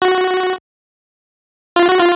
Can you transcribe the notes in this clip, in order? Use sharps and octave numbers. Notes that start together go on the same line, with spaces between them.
F#4
F4
F#4
F4